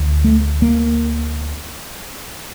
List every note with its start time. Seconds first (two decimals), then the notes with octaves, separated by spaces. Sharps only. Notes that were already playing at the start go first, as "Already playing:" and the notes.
Already playing: D2
0.24 A3
0.62 A#3